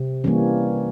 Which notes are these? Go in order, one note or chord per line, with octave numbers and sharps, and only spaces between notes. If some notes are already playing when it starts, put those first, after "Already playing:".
Already playing: C3
E3 G3 A#3 C#4